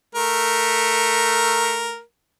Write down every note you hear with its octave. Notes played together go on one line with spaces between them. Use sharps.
A3 A#4